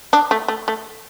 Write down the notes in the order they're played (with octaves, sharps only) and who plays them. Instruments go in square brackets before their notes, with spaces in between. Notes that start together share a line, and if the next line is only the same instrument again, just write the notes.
[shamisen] D4
A3
A3
A3